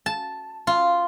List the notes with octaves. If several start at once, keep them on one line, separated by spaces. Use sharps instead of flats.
A5
F4